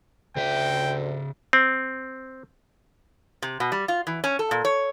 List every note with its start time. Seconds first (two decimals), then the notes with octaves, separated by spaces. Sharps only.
0.36 D2 C#3 E5 G5
1.53 C4
3.42 C3
3.60 B2
3.72 G3
3.88 F4
4.07 E3
4.24 C#4
4.39 A4
4.51 A#2
4.65 C#5